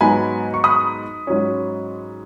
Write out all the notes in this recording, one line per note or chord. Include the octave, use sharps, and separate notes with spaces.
G#2 F#3 B3 D#4 G#5 B5
C#6
B5 D#6
G#2 F#3 C#4